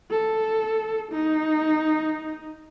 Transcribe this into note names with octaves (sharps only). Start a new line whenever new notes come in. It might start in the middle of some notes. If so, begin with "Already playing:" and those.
A4
D#4